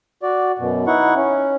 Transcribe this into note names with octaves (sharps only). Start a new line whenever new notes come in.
F#4 D5
F#2 B2
D#4 E4 F#5 C#6
C#4